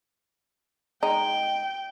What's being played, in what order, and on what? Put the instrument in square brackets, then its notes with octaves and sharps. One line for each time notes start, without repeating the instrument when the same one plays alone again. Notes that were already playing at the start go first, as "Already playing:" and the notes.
[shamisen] G#3 D#4 [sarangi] G5